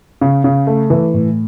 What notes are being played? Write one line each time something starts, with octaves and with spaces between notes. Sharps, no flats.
C#3
C#3
A3
E3
A2